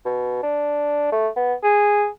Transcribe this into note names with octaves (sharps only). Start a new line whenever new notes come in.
B2
D4
A3
B3
G#4